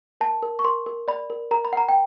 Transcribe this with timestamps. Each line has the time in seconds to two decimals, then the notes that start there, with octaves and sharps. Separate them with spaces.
0.21 A#4 A5
0.43 A#4
0.59 C#6
0.64 A#4 C6
0.86 A#4
1.08 D5 B5
1.30 A#4
1.51 A#4 A#5
1.65 B5
1.73 F#5 A#5
1.89 G5